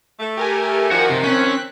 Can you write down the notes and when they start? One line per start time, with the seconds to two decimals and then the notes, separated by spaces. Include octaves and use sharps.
0.20 A3
0.37 G4 A#4 G#5
0.91 D#3 F3 F#4 F#5
1.10 C3
1.23 C4 C#4 F#6 B6